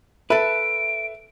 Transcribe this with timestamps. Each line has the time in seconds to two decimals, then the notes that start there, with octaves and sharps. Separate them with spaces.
0.30 A4 B4 E5 D7